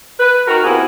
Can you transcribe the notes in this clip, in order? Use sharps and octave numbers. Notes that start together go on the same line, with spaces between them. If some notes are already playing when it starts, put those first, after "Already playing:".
B4
D#3 F#4 A#4
C3 A#3 B3 E4 F#4 G#4